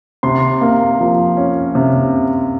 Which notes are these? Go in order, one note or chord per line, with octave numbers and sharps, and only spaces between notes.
C3 C6
A#3
F3
C#4
C3